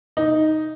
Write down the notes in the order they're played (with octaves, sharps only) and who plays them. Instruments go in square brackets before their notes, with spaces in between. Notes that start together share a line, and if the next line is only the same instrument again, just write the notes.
[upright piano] D#4